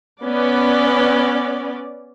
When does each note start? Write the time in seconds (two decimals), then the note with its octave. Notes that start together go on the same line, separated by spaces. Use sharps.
0.22 B3 C#4 D5